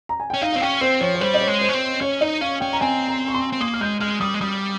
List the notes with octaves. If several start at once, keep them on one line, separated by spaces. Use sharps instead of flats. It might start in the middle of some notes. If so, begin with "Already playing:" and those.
A#5
G#5
C#4 G5
D#4 F5
C4 F5
C#4 G5
C4 C5
F3 C#5
C#5
G3 C5
D#5
C#5
G#3
C5
C#4
C4
C#4 C#5
D#4 D#5
C#4 F5
C#4 G5
A#5
C4 G#5
A#5
C#6
C6
C4
A#3 D#6
F6
G#3 G6
G#3 F6
G3 D#6
G#3
G3 D#6